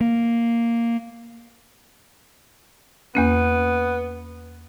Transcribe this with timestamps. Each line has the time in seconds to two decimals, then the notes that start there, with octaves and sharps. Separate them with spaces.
0.01 A#3
3.15 E2 A#3 B3 C#4